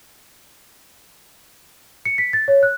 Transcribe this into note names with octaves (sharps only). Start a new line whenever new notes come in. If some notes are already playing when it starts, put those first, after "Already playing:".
C#7
B6
A6
C#5
F#6